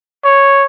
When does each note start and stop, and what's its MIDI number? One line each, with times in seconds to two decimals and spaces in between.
0.25 0.66 73